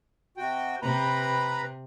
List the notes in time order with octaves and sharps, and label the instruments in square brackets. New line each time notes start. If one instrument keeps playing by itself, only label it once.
[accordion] C3 F#4 G5
[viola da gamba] C3 [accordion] B4 A#5 B5